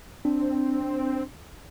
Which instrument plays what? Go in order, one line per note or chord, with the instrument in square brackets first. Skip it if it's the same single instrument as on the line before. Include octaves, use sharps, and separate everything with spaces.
[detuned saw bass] C4 [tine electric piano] D4